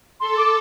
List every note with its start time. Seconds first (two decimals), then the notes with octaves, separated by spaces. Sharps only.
0.20 A4 C6
0.37 D6